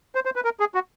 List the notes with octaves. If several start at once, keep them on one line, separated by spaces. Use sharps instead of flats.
C5
C5
B4
A#4
G#4
F#4